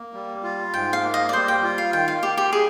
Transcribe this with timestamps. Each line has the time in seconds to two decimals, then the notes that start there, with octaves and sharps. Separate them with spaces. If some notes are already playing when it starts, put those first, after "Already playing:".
Already playing: A#3
0.13 G3
0.43 F4
0.74 G#2 G5
0.93 F5
1.03 A#3
1.14 D#5
1.29 D5
1.33 G3 C5
1.48 G5
1.63 F4
1.78 F5
1.93 D#3 G5
2.08 F5
2.22 A#3 G4
2.37 G4
2.53 G3 G#4